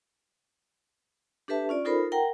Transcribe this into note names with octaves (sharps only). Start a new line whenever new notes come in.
D4 G4 A4 B4 E5 A5
C#4 F4 D5
D#4 F4 A4 A#4 C5 B5
A#4 F#5 G5 A#5